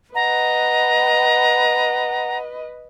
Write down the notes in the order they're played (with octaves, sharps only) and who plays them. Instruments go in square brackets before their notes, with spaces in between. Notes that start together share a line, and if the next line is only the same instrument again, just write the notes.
[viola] B4 D#5 [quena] F#5 [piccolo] A#5